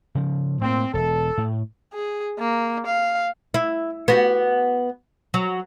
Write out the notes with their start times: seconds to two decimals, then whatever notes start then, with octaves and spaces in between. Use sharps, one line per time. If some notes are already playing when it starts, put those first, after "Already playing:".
0.15 C#3 F3
0.61 A2 A#3 C4
0.94 E1 A4
1.38 A2
1.93 G#4
2.39 A#3
2.86 F5
3.54 E4
4.08 B3 F#4 G4
5.34 F#3